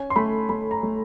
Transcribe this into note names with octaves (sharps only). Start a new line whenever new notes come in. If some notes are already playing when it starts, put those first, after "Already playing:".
Already playing: C#4 G#5
C6
A3 B5
A3 B5
A#5
A3